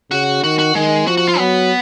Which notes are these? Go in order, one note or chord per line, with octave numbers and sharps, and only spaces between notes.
C#3 F#4
D#3 F#4
F#4
D#3 G#3
F3 F#4
F#4
F4
F#3 B3